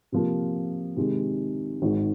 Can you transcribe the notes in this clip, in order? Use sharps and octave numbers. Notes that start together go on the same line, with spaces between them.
C3 F3 A#3
C3 D#3 G#3
G#1 G#2 D#3